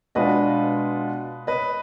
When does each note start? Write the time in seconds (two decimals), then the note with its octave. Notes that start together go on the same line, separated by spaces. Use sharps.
0.15 B2 G#3 D4 F4 B4 D#5
1.47 B4 D#5